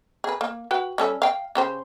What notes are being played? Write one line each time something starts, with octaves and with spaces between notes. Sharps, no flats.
G#4 B4
A#3
F#4 B4 G5
G3 C#4 A4
F5 G5
C#3 G4 C5